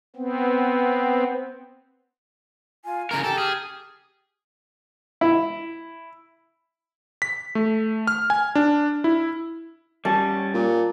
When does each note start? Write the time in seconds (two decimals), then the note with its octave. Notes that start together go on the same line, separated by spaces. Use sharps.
0.16 B3 C4
2.85 F4 G#5
3.11 C#3 A#4 A#5
3.24 G4 A4
3.38 G#4 F6
5.21 E4
7.22 B6
7.55 A3
8.07 F6
8.30 G#5
8.55 D4
9.04 E4
10.05 G3 C#4 A5
10.54 A#2